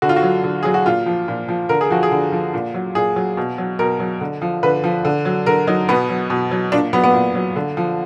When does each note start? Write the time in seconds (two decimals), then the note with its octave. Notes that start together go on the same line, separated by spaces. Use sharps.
0.02 D3 F#4
0.09 F4
0.16 F#4
0.23 F#3
0.44 D3
0.63 F#3 G#4
0.74 F#4
0.86 A#2 F4
1.06 F3
1.28 A#2
1.49 F3
1.69 D3 A#4
1.81 G#4
1.91 F3 F#4
2.03 G#4
2.11 D3
2.32 F3
2.54 A#2
2.74 F#3
2.95 A#2 G#4
3.16 F#3
3.37 B2
3.58 F#3
3.79 B2 A#4
4.00 F#3
4.21 D3
4.42 F3
4.63 D3 B4
4.84 F3
5.05 D3
5.25 F#3
5.46 D3 A#4
5.67 F#3 D#4
5.88 B2 B3
6.09 F#3
6.30 B2
6.51 F#3
6.72 A#2 D4
6.93 F#3 B3
7.04 B3
7.14 A#2
7.35 F#3
7.56 D3
7.77 F3